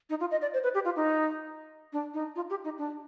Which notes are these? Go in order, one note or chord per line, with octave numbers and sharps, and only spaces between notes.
D#4
F4
D#5
D5
C5
B4
G4
F4
D#4
D4
D#4
F4
G4
D#4
D4